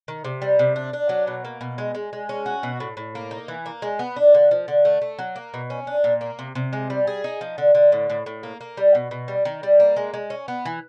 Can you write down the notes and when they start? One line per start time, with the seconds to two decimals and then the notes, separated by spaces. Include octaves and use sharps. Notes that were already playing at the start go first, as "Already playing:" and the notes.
0.08 D#3
0.25 C3
0.42 G3
0.59 C3
0.76 D4
0.93 D4
1.09 F#3
1.27 B2
1.45 A#3
1.61 B2
1.78 G#3
1.95 G#3
2.13 G#3
2.29 C#4
2.46 F#4
2.63 B2
2.80 A2
2.97 A2
3.15 A#3
3.31 D#4
3.48 E3
3.66 A#3
3.82 G#3
3.99 B3
4.16 D4
4.34 D3
4.51 F3
4.68 D3
4.85 A3
5.01 A3
5.19 F#3
5.36 A#3
5.54 B2
5.70 C#4
5.87 D4
6.04 A#2
6.21 A#3
6.39 C3
6.55 C3
6.73 G#3
6.90 G3
7.07 G#4
7.24 D#4
7.41 F3
7.58 D3
7.75 D3
7.92 A2
8.10 A2
8.26 A2
8.43 A#3
8.61 A#3
8.77 G3
8.95 B2
9.11 B2
9.28 G3
9.45 D#3
9.63 G3
9.80 A#3
9.96 G#3
10.14 G#3
10.30 C#4
10.48 B3
10.65 E3